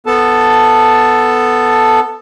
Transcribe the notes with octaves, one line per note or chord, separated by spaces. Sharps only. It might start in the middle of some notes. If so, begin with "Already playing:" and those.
B3 A4 A5